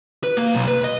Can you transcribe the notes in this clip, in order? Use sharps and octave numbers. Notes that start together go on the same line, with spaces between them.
B4
A#3
B1
B4
D#5